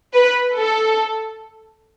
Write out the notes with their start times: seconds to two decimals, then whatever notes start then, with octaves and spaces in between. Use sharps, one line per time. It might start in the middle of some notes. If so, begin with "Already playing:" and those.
0.14 B4
0.58 A4